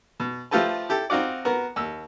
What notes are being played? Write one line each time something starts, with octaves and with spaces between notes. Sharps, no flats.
B2
F3 A3 F4 G4 A4 B4
E4 G4 A4
C4 D#4 F4 F#4 D5
B3 F#4 A#4
D#2 E6